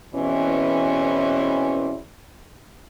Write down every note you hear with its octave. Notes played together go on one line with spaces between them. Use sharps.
E2 B2 E3 C4 C#4